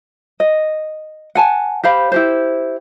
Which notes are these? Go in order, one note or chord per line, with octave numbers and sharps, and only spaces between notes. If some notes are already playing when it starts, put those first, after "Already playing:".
D#5
F#5 G#5 A5
G4 C5 F5 B5
E4 G4 C5